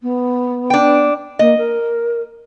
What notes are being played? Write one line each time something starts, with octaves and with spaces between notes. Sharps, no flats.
B3
D4 G5
A#3 D#5
A#4